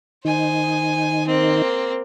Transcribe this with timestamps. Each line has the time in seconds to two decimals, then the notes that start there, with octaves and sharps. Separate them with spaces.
0.25 D#3 D#4 C5 G#5
1.27 A#3 C4